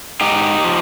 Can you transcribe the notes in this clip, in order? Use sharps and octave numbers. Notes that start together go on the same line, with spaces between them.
G#2 D#4 G4
F3